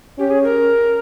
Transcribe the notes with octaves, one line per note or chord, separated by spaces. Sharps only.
C#4 G4
G#4
A#4